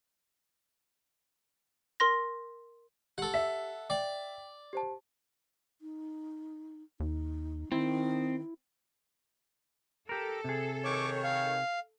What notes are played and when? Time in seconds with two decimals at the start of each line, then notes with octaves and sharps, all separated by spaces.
2.00 A#4 C6 A#6
3.18 G4 A4 F#5
3.34 E5
3.90 D5 G5 D6
4.73 G4 C5 A5
5.81 D#4
7.00 D#2 D#4
7.72 D#3 C4 E4
10.09 G4 A4 A#4
10.44 C3 G#4
10.85 D#3 C#5 C#6 D6
11.24 F5